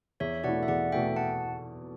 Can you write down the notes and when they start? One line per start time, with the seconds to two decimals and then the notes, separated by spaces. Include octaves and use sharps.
0.20 E2 C#5 E5
0.44 B2 A3 E4 D5 F#5
0.63 E5
0.68 E2 D5 F#5
0.92 B2 A3 E4 E5 G5
1.16 F#5 A5